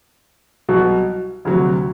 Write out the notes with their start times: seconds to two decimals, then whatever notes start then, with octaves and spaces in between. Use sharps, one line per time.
0.69 C2 B2 F#3
1.45 D2 C3 F#3